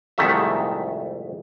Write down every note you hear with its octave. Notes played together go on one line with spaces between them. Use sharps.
C2 F2 G#2 D#3 A3 E5